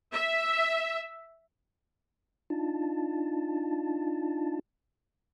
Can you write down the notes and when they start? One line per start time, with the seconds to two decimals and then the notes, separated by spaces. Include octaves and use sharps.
0.12 E5
2.50 D4 D#4 F4 A5